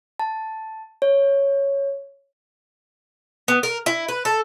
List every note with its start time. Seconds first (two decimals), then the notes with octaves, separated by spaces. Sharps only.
0.19 A5
1.02 C#5
3.48 B3
3.63 A#4
3.86 E4
4.08 B4
4.25 A4